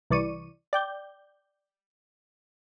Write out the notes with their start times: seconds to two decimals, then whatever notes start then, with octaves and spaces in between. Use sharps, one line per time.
0.10 C2 E3 D5 C#6 D#7
0.73 D5 G5 G6